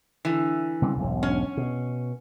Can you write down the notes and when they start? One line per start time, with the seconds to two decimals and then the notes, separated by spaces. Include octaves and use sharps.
0.25 D3 E3
0.82 C#3 G3 C4
0.97 E1 B1 G#2
1.23 C#4
1.57 B2